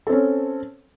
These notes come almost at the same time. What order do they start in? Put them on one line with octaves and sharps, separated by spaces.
A4 C4 C#4